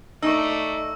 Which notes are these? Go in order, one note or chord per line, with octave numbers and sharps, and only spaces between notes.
A3 D#4 D5 C#6 E6